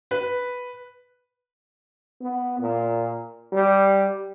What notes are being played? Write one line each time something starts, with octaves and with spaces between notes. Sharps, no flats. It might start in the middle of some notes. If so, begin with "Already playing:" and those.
B4
B3
A#2
G3